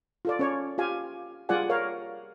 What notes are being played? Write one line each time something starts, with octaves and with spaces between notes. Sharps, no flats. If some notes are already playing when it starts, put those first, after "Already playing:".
F4 A4 D5
C#4 C#5 D5
F4 G4 F5 G#5
G3 F4 G#4 D5 F#5 G#5
A#4 C#5 F5